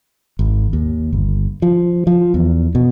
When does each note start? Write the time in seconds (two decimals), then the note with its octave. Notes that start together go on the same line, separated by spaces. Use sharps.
0.39 G#1
0.73 D#2
1.13 G1
1.62 F3
2.07 F3
2.34 E2
2.75 B2